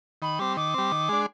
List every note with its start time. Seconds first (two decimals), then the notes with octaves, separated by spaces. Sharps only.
0.22 D#3 B5
0.39 G3 C4 D6
0.57 D#3 D6
0.74 G3 C4
0.92 D#3
1.09 G#3 D4